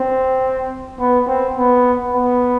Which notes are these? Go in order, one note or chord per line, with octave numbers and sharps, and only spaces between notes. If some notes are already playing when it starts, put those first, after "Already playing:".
Already playing: C4
B3
C4
B3
B3